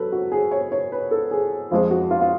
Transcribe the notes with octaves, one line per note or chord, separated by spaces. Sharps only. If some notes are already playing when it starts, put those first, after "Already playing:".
Already playing: F#3 A4 B4
F#4
G#4
C#5
C#5
B4
A4
G#4
F2 F3 G#3 F4
F#4
F4
F4